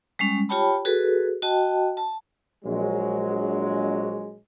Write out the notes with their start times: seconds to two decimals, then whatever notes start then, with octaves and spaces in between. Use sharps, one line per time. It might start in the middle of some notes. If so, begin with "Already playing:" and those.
0.19 G3 G#3 C#4
0.49 F4 G4 C#5 G5 A5 B5
0.85 F#4 G#4 A4 B4
1.42 F#4 D#5 G5 A5
1.97 A5
2.64 A#1 F#3 G#3